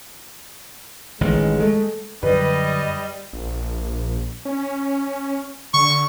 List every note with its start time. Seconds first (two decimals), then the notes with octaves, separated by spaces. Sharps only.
1.21 A1 D#3 G#3
1.60 G#3 A3 A4
2.23 F#2 D3 F#3 G3 B4 D#5
3.33 A#1
4.45 C#4
5.74 D3 C#6